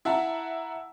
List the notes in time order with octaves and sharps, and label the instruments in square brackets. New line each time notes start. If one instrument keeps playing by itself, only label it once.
[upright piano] E4 E5 F#5 A5 A#5